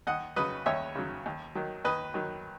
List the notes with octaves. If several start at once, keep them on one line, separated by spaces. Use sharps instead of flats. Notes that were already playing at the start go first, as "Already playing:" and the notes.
D#2 D#5 F#5
C#3 F#3 B4 D#5
D#2 C#5 E5
C#3 F#3
D#2
D#3 F#3
D#2 B4 D#5
D#3 F#3